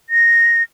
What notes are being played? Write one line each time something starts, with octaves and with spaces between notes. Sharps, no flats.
A#6